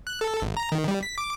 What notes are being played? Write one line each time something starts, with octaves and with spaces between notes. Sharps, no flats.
F#6
A4
G#1
A#5
D#3
G3
B6
D6